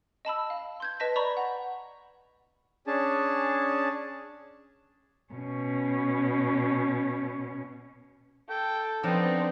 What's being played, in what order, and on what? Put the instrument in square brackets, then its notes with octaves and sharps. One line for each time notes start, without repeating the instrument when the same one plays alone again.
[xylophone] D#5 A5 B5 E6
F5
C6 G6 G#6
B4 D#5 A5 A#6 B6
D5 A#5 B5 C#6
F#5
[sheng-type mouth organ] C#4 D4 G#4 A5
[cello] B2 C#4
[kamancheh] A4 [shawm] G5
[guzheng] F3 D4 [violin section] B3 C4 [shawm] D#4